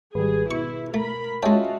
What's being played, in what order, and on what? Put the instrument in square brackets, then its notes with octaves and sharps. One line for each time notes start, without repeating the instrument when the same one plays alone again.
[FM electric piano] G#1 G3 [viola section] G#4 [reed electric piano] B4
[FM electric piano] B2 [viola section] E4 [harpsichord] C#6
[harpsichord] A3 [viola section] A#4 B5
[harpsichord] G#3 G5 [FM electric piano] C#4 [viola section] F4 F#4 [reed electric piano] D#5 E5 A5